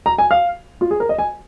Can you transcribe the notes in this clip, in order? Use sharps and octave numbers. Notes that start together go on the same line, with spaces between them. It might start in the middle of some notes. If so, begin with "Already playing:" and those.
A#5
G#5
F5
F4
G#4
A#4
D#5
G#5